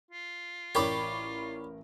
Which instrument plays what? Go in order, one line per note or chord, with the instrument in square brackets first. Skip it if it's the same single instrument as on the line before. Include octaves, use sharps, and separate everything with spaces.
[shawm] F4
[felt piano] A1 A#4 [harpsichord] G4 D5 [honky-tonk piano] C#5 B5 C#6